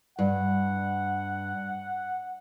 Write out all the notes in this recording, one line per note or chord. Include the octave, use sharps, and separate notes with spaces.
G2 F#5